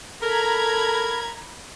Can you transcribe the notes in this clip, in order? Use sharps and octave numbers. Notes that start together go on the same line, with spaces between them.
A4 A#4 A#5 B5 G#6